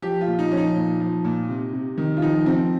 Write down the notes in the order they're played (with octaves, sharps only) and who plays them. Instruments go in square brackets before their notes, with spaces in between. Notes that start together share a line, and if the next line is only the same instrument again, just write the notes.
[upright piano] F3 G4
F4
A#2
D#4
F3 C#4
D#4
A#2
F3
A#2
C3
C3
D#3
F4
F3 D#4
F3 C4